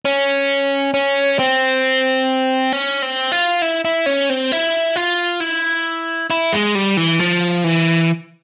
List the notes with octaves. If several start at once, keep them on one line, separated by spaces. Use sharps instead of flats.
C#4
C#4
C4
C#4
C4
F4
E4
E4
C#4
C4
E4
F4
E4
E4
G#3
G3
E3
F3
E3